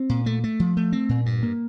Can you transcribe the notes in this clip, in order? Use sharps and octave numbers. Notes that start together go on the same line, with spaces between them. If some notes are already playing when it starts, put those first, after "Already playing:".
Already playing: C4
A#2
A3
A3
F3
A3
C4
A#2
G2
A#3